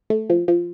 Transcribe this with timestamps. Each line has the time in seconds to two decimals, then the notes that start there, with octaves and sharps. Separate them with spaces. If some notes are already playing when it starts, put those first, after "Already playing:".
0.10 A3
0.30 F3
0.48 F3